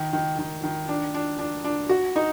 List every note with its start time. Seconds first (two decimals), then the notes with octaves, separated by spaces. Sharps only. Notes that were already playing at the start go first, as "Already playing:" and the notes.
Already playing: D#3
0.13 D#3
0.39 D#3
0.63 D#3
0.88 D4
1.14 D4
1.39 D4
1.64 D4
1.89 F#4
2.16 D#4